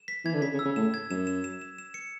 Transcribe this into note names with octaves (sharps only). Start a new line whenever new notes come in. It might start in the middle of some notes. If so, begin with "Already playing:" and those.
Already playing: E7
B6
E3 G#6
D3
C#3 B6
C#3
E6
C#3
A2 E7
G#6
F#2 E7
E7
E7
E7
E7
C#7